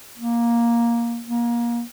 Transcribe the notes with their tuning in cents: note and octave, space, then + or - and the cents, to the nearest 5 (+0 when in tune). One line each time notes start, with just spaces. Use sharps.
A#3 +10
A#3 +25